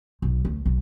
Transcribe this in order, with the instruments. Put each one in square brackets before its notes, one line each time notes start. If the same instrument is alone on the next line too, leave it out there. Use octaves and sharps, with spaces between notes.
[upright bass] B1
D2
B1